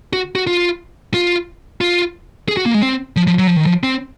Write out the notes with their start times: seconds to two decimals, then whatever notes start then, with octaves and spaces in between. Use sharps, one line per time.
0.13 F#4
0.35 F#4
0.47 F4
1.14 F4
1.81 F4
2.48 G#4
2.57 F#4
2.66 A#3
2.74 G#3
2.82 C4
3.16 F3
3.27 F3
3.39 F#3
3.47 F3
3.56 D#3
3.66 F3
3.83 C4